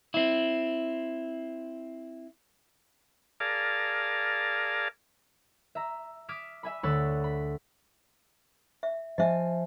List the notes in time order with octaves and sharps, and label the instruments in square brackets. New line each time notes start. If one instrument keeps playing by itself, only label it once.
[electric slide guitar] C4 E4
[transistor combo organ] G#4 A#4 D5 F5 A5
[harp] E5 A#5
D6 D#6 F6 G#6 B6 E7
E5 G#5 B5
D2 C#5 F#5 B5 E6 A6
B5
[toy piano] E5
[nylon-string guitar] F3 G#5 [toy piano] D#5 E5